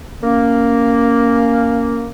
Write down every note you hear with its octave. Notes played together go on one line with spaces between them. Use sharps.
A#3 C#4